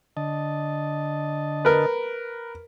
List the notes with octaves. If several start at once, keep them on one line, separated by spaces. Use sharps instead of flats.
D3 D#5 A5
A#4 B4